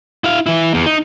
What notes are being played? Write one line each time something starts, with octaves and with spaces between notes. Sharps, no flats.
E4 F5
E3 E4
E2
D#4